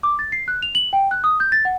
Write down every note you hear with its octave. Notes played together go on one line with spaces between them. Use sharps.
D6
A6
C7
F#6
F7
F#7
G5
F#6
D#6
G6
A6
F#5